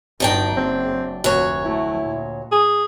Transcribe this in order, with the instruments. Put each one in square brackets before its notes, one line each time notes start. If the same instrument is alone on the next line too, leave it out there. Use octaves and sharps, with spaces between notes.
[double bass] G1 D#4 [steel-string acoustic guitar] F#2 D4 G5
[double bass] F#1 [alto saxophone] C4
[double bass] F1 [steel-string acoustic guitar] D2 C#5 [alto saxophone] F#4
[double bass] F#3 A3 [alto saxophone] E4
[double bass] A#2
[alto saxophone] G#4